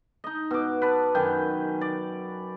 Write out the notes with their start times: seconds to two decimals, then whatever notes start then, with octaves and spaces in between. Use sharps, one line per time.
0.24 D#4 D#5
0.51 B2 D6
0.82 B4 D5 A5
1.15 F#2 D#3 G5 G#5
1.81 D5